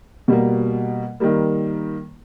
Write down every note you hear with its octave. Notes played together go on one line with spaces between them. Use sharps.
B2 G3 A#3
D#3 G3 A#3